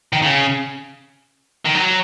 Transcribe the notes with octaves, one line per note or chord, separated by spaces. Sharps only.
D#3
C#3
D#3
F#3